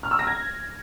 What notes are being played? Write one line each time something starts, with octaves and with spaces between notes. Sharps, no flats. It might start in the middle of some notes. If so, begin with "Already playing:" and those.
F6
E6
A#6
G#6